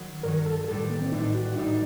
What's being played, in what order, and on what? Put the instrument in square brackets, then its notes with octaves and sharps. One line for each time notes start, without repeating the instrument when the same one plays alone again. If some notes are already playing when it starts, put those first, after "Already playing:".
Already playing: [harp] D#3 F#3
[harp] G2 D#3 F#3 [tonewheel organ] A#4
[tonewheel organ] A4
[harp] A1 A2 G3 D4 [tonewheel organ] A4
[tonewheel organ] A4
A#3
C4
[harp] A1 A2 G3 D4 [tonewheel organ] D#4
[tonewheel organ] F#4
[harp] A1 A2 G3 D4 [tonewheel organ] D#4